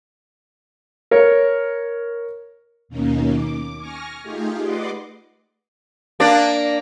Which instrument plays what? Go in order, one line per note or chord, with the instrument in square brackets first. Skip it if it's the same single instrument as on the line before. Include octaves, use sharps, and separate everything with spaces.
[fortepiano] A#4 C#5
[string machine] D#2 B2 A#3 C#4 D#4
D6
G#5 C#6 F6 A#6
A3 D#4 F4 G4 G#4
B4 D5 D#5 F#5 C6 D6
[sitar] A#3 D4 D5